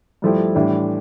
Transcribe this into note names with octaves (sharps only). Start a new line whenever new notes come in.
G2 F3 A3 E4 G4
A2 E3 G3 D4